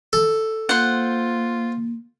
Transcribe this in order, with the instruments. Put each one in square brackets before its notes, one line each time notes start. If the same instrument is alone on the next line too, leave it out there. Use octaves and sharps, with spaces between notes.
[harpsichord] A4
[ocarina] A#3 [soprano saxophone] F4 [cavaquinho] C5 F#5